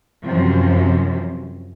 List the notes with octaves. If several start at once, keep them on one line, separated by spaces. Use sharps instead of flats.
F#2 C3 E3 F3